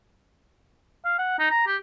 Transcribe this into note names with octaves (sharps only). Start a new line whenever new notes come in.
F5
F#5
D#4
A#5
G4